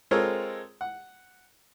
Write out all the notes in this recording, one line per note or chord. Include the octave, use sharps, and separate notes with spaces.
G#3 C4 F4 A4 A#4 C#5
F#5